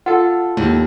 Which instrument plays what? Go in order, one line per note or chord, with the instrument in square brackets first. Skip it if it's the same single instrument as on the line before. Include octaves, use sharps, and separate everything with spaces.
[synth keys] F4 A4 [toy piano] F#5
[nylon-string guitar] D#2